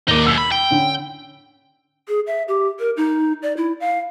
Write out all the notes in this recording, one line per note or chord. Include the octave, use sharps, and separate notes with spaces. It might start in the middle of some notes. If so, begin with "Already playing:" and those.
D#2 A#3 D#4 D5 D#7
F#2 B2 E6
B5
G5
D3 C#4
G#4
E5
G4
A#4
D#4
D5
E4
F5